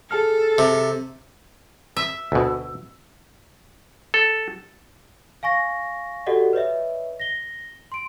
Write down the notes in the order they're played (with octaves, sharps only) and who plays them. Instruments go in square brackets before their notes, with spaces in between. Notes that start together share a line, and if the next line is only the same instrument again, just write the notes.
[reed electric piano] G#4 A5 F6 [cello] A4
[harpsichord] C3
[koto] E5
[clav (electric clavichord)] D2 B2
A4
[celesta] F5 G#5 C#6 A#6
F#4 G4 A4 D5 D#5 F#5
B4 C#5 D#5 E5
A#6 G7
C6 D7